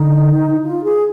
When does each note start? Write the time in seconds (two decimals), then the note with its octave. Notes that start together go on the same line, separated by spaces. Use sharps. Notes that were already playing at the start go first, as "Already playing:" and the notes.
Already playing: D3 D#4
0.64 F4
0.83 G#4